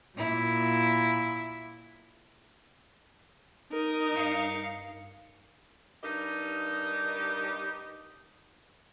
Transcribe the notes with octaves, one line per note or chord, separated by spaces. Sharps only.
A#2 E4
D#4 A#4
G2 F5 C#7
G2 D#4 G4 A#4 D#5